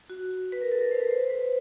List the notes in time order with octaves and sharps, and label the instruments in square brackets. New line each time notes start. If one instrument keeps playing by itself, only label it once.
[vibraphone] F#4
B4
A#4
A4
A#4
C5
B4
C5
B4